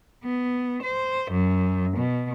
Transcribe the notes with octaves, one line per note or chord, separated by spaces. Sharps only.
B3
C5
F#2
B2